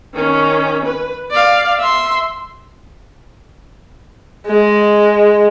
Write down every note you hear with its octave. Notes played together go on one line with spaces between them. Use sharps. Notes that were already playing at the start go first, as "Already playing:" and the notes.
D#3 C#4
B4
D5 F5
E5 C6
G#3